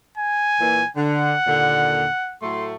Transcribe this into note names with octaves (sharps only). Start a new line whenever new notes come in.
G#5
A#2 E3
D3 F#5
D#2 A#2 D3
A2 F#3 A3 C6